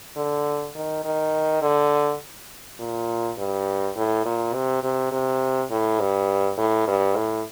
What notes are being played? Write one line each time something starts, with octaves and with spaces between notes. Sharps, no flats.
D3
D#3
D#3
D3
A#2
G2
A2
A#2
C3
C3
C3
A2
G2
A2
G2
A2